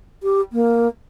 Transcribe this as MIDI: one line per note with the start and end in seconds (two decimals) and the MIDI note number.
0.23 0.41 67
0.53 0.88 58